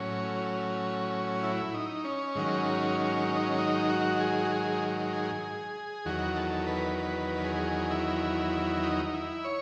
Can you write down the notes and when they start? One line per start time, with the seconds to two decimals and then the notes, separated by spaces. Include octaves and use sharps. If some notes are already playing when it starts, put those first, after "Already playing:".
Already playing: A2 F#3 C#4
1.43 E4
1.74 D#4
2.04 C#4
2.35 G#2 D#3 F#3
3.28 C#4
3.36 D#4
3.45 C#4
3.58 D#4
3.90 F#4
4.20 G#4
4.45 F#4
4.51 G#4
5.13 G#4
6.05 E2 D#3 F#3 F#4
6.37 A4
6.67 B4
6.98 B4
7.44 G#4
7.91 E4
8.83 D#4
9.14 E4
9.45 C#5